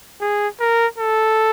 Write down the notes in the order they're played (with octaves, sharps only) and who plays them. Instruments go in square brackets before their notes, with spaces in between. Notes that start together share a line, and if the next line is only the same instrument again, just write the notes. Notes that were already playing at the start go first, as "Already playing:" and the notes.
[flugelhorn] G#4
A#4
A4